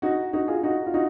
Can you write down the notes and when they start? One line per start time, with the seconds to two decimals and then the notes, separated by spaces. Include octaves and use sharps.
0.02 D#4 F#4
0.33 D#4 F#4
0.48 F4 G#4
0.63 D#4 F#4
0.87 F4
0.94 D#4 F#4